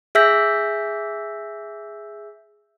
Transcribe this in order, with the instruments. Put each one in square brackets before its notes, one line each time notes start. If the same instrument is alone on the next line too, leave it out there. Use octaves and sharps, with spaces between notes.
[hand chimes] G#4 E5 E6 G6 B6